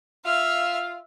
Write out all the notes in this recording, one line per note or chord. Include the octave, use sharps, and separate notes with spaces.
F4 E5 F5 F6